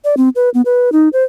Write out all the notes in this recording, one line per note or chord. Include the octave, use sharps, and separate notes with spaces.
D5
C4
B4
B3
B4
D#4
C5